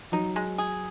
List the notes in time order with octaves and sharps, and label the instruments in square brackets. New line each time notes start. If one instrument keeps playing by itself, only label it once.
[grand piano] F#3 [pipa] D#4
[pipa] G#3
G#4